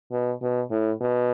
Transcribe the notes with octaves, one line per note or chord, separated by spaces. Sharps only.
B2
B2
A2
B2